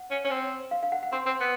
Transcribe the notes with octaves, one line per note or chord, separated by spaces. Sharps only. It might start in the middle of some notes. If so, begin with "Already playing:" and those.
Already playing: F#5
C#4
C#4
C4
F5
F5
F#5
F#5
C4 C6
C4
B3